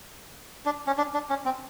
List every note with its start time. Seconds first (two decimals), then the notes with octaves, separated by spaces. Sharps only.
0.66 D4
0.87 C#4
0.98 D4
1.14 D4
1.30 C#4
1.45 C4